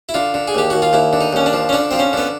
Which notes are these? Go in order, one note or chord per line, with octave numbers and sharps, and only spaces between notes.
E4
D3 F4
D3
G#4
D#2 G4
D#2 F#4
F4
D#2 E4
D3
D#4
D#2 C#4
D4
F3
C#4
D3 D4
F3 C4
C#4
D3 B3